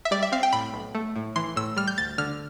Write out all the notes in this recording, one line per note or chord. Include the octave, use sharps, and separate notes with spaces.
E5
G3 D5
E5
C4 F5
G5
A2 B5
B1
A3
A2
E3 C6
A2 E6
G3 F6
G6
D2 A6
D3 F6